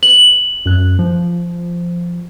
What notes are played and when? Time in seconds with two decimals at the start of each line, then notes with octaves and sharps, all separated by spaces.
0.03 F#7
0.66 F#2 F#6
0.99 F3